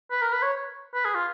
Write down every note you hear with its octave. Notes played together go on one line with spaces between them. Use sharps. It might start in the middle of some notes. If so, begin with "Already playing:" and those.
B4
A#4
B4
C#5
B4
G#4
F4